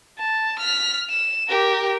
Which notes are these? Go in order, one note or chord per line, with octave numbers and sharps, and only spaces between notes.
A5
F6 B6
E7
G4 A#4